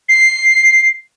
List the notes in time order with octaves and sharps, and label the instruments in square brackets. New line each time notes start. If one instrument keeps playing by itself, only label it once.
[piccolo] C7